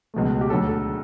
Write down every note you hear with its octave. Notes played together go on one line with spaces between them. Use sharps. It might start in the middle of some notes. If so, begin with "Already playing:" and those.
C#2 B2 A3
G4
D2 D3 F#3 A3 A4
A4